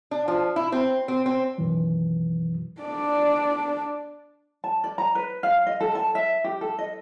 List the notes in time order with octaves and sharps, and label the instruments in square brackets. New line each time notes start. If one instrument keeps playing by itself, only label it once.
[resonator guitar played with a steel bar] D4
F3
E4
C4
C4
C4
[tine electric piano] F#2 B2 D#3 E3 F#3
[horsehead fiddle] D4 D5
[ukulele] A5
D5
A#5
B4
F5
D#5
A4
A5
E5
G4
A4
D#5